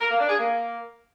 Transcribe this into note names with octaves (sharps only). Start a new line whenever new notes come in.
A#4
A#3
D4
G#4
A#3